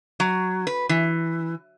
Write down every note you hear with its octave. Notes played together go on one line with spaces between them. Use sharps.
F#3
B4
E3